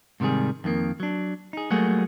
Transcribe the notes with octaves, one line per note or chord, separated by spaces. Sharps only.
G#2 C3 D#3 G3 G#4
F2 D#3 G3 A#3
F#3 D4
D#4 G#4
F#3 G3 A3 A#3 F#4 G#4